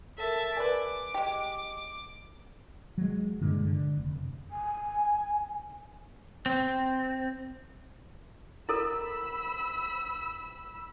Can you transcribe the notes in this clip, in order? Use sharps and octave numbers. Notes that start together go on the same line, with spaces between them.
A4 A#4 E5 A5
G#4 A#4 B4 D5 D6
G#3 G4
F#3 G#3
G2 A#2 D3 G#3
D3
F1
G#5
C4
E4 A4 A#4 B5 E6